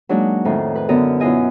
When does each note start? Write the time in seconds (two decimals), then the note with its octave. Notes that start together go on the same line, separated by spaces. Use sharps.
0.09 F#3 G#3 A#3 D4 D#4 F#4
0.45 F2 A2 D#3
0.75 B4
0.89 F#2 D3 B3 A4 A#4 D#5
1.20 F#2 B2 E4 F4 D#5 G#5